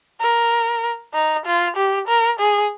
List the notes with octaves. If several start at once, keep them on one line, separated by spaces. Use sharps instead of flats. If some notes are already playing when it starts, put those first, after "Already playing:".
A#4
D#4
F4
G4
A#4
G#4